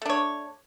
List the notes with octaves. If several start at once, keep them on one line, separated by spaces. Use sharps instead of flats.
A3 D4 C#5